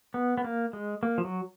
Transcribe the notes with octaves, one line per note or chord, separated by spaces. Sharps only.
B3
B3
A#3
G#3
A#3
F3
F#3